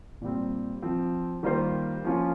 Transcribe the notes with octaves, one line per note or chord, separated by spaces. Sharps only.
A#2 G3 C4
F3 C4 F4
D#3 G3 A#3 F4 C5
F3 A#3 C#4 F4